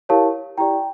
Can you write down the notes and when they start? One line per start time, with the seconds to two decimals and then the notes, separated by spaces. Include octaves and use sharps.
0.09 E4 G4 A#4 C#5 F5 A5
0.58 E4 G4 D5 G5 A#5